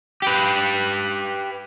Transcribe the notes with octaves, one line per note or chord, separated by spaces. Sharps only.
G4 B4